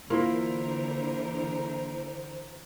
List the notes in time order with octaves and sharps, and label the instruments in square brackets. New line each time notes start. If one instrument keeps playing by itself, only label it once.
[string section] D3 E3 A#4 [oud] A#3 [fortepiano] E4 F4 C6 [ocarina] C5